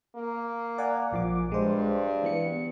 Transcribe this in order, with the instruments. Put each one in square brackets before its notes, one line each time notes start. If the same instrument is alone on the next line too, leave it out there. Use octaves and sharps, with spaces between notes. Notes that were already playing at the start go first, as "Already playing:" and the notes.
[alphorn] A#3
[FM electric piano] D5 F#5 G#5
A#1 F3 D6
[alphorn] G2 [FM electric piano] G#3 C5
[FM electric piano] E3 B3 C#7